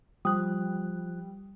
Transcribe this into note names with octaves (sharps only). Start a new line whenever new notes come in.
F3 G3 D#6 F#6